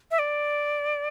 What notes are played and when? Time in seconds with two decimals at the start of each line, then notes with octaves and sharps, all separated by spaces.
0.11 E5
0.19 D5